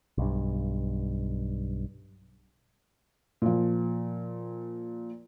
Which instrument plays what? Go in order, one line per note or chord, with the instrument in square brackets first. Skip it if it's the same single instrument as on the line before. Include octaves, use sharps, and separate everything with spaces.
[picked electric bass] B1 G2
[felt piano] A#2 F3